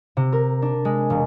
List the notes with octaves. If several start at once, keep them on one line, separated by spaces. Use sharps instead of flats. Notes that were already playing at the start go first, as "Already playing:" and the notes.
C3
A#4
D4
G#3
E1